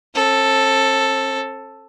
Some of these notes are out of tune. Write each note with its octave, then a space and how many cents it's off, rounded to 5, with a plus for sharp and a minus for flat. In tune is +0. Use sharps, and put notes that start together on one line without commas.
C4 +45 A4 +0